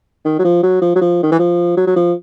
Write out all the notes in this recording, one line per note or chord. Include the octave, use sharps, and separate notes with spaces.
D#3
F#3
F3
F#3
F3
F#3
F3
D#3
E3
F3
F#3
F#3
F3